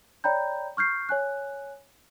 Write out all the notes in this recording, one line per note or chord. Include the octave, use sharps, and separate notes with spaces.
C#5 D5 G5 A#5 B5 G6
C#6 F6 G6 C7
C#5 G#5 F#6